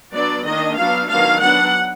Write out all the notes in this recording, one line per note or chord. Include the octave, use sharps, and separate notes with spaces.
F#3 B3 D4 D5
D#3 A#3 D4 D#5
F#3 B3 D4 F5
D#3 F#3 B3 D4 F5
F#3 B3 D4 F#5